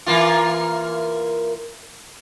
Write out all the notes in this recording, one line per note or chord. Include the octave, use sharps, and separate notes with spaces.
E3 A#3 F4